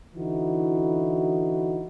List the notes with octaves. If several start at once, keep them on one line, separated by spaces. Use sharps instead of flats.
D3 E3 D#4 E4 F#4